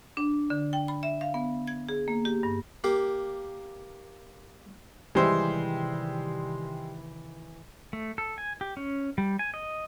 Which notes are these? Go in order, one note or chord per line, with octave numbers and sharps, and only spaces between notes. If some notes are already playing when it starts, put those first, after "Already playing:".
D4
D3
G5
B5
E5
F5
B3
G#6
G#4
A#3
G4
G2
A#3 G4 F5
C3 D#3 E3 G3 G#3 C5 E5
A3
A4
G#5
G4
C#4
G3
G#5
D#5